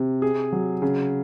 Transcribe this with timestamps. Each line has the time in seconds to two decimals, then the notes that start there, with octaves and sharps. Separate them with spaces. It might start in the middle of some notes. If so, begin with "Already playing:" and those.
Already playing: C3
0.22 G#4
0.52 F#3
0.82 C#3